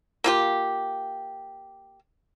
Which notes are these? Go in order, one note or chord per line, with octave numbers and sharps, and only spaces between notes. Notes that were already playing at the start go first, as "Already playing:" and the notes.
A#3 F4 G4